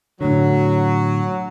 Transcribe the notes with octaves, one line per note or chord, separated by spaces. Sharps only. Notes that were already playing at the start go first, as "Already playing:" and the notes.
A2 D3 F#3